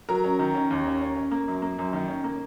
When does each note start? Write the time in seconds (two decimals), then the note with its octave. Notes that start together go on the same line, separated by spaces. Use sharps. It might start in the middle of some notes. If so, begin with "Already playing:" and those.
0.09 F#3 A#4 A#5
0.24 C#4
0.39 D#3
0.55 C#4
0.70 D#2
0.86 C#4
1.01 C#4
1.16 C#4
1.31 A#3
1.48 F#2
1.62 A#3
1.79 F#2
1.93 D#3
2.08 C#4
2.24 A#3